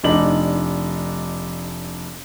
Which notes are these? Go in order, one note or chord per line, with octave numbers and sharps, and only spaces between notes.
F1 D4 D#4 F#7